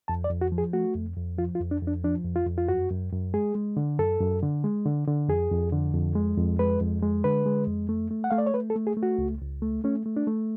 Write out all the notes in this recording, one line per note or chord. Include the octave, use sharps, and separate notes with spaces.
F2 A5
D5
F2
F#4
F3
G#4
A3 F#4
F2
F2
F3 F4
F4
F2
D4
F2 D4
F3 D4
F2
F4
F2
F4
F#2 F#4
F#2
F#2
G#3 G#4
G#3
D3
F#2 A4
F#2
D3
G#3
D3
D3
F2 G#4
F2
D3
F2
G#3
F2
G#3 B4
F2
G#3
D3 B4
G#3
F2
A3
A3
F#5
A3 F5
D5
C#5
A3 B4
A4
A3
G#4
A3
F#4
C#2
C#2
A3
A3 C#4
A3
D4
A3